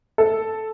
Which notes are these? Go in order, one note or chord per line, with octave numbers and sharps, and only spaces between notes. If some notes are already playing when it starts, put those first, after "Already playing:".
A4